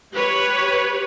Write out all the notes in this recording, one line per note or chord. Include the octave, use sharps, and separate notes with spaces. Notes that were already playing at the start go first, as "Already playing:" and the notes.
G4 B4 C#5